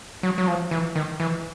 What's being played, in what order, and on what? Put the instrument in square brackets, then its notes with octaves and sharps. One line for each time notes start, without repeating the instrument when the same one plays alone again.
[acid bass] F#3
F#3
F3
E3
D#3
E3